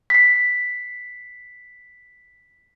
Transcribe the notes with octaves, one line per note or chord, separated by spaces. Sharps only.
B6 C7